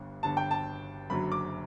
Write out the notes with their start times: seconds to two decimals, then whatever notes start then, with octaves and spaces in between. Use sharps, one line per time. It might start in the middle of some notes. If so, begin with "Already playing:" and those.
Already playing: G1 G2 D3
0.23 G1 G2 D3 A5
0.37 G5
0.51 A5
1.10 F#1 F#2 D3 F#3 B5
1.32 D6